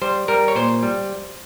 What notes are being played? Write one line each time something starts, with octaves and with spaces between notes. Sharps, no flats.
G3 C5
G3 A#4
C#5
A#2 C5
G3